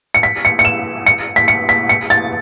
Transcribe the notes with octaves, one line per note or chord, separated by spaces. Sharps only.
C#7
B6
C#7
C#7
E7
C#7
B6
C#7
B6
C#7
A6